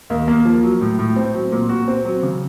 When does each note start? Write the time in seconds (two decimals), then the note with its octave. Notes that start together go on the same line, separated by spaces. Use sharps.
0.10 D#2
0.28 A#3
0.45 F3
0.63 F#3
0.81 A2
0.99 A2
1.16 C4
1.34 F#3
1.52 A#2
1.69 F#4
1.88 C4
2.05 F#3
2.23 C#3